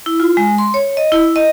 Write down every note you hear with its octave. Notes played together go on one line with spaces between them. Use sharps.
E4
F4
G#3
C6
C#5
D#5
E4
D#5